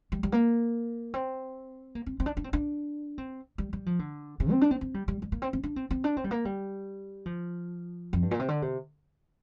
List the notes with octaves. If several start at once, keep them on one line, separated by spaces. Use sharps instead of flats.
G3
G3
A#3
C4
A#3
C4
C4
D4
D4
C4
D4
C4
G3
G3
F3
D3
C3
C4
D4
C4
C4
G3
G3
G3
A#3
C4
C4
D4
C4
C4
D4
C4
G3
A#3
G3
F3
F2
G2
A#2
C3
D3
C3